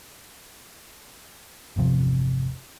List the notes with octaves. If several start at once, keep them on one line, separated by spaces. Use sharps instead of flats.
G1 E2 C3 F3